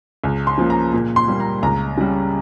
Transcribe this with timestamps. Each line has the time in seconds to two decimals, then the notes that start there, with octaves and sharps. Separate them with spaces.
0.24 C#2
0.47 C6
0.58 C#3 F3 A#3
0.70 A#5
0.93 A#2
1.16 C6
1.28 G3 A#3
1.40 A#5
1.63 C#2 A#5
1.97 C#3 G3